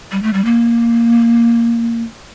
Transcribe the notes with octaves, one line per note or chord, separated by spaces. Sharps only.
G3
A3
G3
A#3